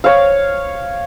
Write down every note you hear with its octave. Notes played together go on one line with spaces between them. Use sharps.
C#5 F5